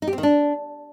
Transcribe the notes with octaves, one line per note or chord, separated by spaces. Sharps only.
D#4
G4
C4
D#3
D4